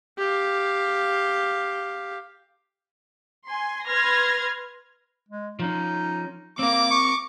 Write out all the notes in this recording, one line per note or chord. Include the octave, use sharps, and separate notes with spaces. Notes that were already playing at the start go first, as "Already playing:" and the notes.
G4 F5
G#5 C6
B4 C6 F6 G#6 A#6
G#3
F3 C#4 D#4
A#3 C4 A#4 D6
C#6